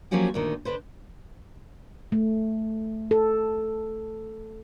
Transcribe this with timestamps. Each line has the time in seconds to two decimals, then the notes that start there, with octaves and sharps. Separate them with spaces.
0.11 F3 F#3 A#3 C#4 F#4 G4
0.34 D2 A#2 D#3
0.65 D3 D4 B4 C5
2.12 A3
3.11 A4